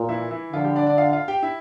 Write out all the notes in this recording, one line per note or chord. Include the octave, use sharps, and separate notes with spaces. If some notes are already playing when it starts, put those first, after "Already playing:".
Already playing: A#2
E3 E4
E3 E4
D3 F3 F4
G3 G4
D4 D5
D4 D5
F4 F5
F4 F5
G4 G5
E4 E5